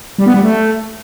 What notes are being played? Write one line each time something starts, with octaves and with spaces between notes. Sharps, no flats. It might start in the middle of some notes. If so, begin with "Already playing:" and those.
G3
B3
G3
A3